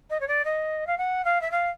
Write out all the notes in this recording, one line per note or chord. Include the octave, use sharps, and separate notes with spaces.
D#5
C#5
D5
D#5
F5
F#5
F5
E5
F5